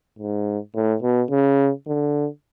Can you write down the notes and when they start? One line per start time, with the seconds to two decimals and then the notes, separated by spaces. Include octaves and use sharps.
0.19 G#2
0.75 A2
1.02 B2
1.31 C#3
1.88 D3